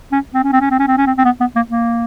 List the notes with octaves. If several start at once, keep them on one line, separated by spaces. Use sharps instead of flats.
C#4
C4
C#4
C4
C#4
C4
C#4
C4
C#4
C4
C4
B3
B3
A#3
A#3